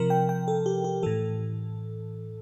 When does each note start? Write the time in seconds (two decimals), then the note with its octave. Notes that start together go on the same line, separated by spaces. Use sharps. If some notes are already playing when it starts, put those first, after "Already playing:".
Already playing: C3 F3 A#4
0.10 G5
0.29 G5
0.48 A4
0.66 G4
0.84 G4
1.03 A2 E3 A4